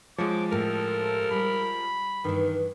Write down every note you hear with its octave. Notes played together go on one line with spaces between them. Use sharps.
F3 G#3 F#4 C5 C#5 D6
A2 A3 A4 A#4
G3 B5
G2 D#3 E3